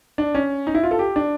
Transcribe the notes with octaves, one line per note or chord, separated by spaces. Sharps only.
D4
C#4
D#4
E4
F4
A4
G4
D4